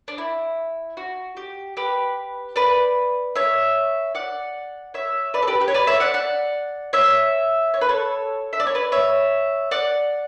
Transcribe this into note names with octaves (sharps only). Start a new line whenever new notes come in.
D4
E4
F#4
G4
G4 B4
B4 D5
C#5 E5
D5 F#5
C#5 E5
B4 D5
A4
G4 B4
G4 B4
C#5
B4 D5
C#5 E5
D5 F#5
D5 F#5
C#5 E5
C#5
B4
A4 C#5
E5
D5
C#5
B4 D5
C#5 E5
D5 F#5